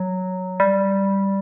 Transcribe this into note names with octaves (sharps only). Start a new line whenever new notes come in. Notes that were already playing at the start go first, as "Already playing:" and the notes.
Already playing: F#3
G3